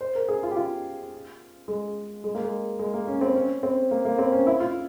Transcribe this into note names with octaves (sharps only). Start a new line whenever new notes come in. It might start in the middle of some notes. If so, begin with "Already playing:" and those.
C5
A#4
G#4
F4
G4
F4
G#3
G#3
A#3
G#3
G#3
A#3
C#4
C4
C#4
C4
A#3
A#3
C4
C#4
E4
F4